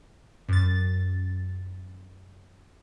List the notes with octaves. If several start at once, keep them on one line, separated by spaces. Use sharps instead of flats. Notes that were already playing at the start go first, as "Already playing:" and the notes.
F#2 A6